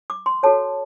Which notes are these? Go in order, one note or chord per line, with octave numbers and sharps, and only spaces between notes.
D6
C6
F#4 A4 C#5 A5